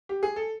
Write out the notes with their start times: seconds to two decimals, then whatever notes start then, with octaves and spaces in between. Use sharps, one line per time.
0.09 G4
0.23 G#4
0.36 A4